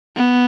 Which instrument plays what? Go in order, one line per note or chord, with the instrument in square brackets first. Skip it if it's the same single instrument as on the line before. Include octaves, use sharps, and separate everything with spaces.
[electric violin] B3